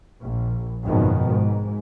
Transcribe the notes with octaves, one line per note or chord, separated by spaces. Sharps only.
A#1
G#1 F#2 B2 D#3 F3
G#2